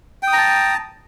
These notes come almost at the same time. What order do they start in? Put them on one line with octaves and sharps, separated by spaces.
G5 D#6 A#5 A5